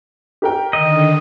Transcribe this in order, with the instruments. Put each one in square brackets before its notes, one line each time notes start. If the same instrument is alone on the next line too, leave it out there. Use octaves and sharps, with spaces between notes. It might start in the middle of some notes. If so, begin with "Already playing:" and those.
[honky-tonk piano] G4 A#4 G5
[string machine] D3 D#3 [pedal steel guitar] D#5